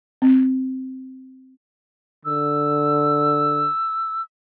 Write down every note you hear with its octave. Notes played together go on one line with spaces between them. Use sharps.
C4
D3 E6